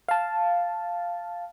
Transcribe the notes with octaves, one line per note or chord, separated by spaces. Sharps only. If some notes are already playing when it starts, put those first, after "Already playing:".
F5 A5